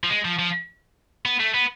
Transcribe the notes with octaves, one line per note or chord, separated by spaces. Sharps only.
F3
G#3
F3
F3
B3
A3
B3